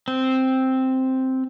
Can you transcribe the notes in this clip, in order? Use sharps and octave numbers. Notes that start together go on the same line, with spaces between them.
C4